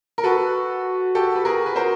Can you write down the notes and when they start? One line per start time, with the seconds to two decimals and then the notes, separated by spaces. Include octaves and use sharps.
0.18 A#4
0.24 F#4 A4 B4
1.15 G4 A4
1.36 B4
1.45 G#4 A#4
1.66 B4
1.76 A#4 C5